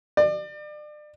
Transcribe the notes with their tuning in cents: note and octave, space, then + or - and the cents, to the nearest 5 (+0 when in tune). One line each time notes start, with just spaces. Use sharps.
D5 +35